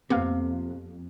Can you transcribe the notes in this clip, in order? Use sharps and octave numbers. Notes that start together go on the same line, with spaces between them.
F2 C3 A#3 B3 F5